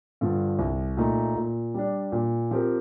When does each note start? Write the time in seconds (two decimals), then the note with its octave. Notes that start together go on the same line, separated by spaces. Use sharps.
0.21 G2 D3 F3
0.59 C2
0.97 A#2 A3 D#4
1.36 A#2
1.74 G3 D4
2.12 A#2
2.51 F3 C4 G4 A#4